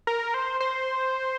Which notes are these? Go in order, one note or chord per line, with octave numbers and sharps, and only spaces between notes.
A#4
C5
C5